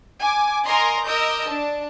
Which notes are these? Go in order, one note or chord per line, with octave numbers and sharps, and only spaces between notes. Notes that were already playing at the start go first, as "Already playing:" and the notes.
G#5 D6
A#4 D#5 G#5 A#5 C6
A#4 D#5 D6 E6 G6
D4 A5